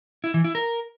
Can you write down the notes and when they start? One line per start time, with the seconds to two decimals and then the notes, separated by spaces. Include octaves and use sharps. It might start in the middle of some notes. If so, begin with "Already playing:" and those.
0.24 E4
0.34 E3
0.44 E4
0.55 A#4